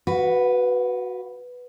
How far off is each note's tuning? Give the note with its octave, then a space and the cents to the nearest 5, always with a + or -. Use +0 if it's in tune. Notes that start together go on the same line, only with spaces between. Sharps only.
F#4 +0 B4 +0 F5 +45